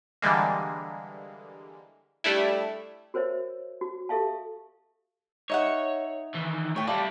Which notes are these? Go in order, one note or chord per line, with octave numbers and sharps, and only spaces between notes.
D3 E3 G3 G#3 A#3
G3 A3 D4 E4
F#4 A#4 C5 C#5 E5
F#4
G4 A4 E5 F5 A5
D#4 C#5 E5 F#5
D#3 E3
A2 C#5 G5
G3 E4 A4 D5 F5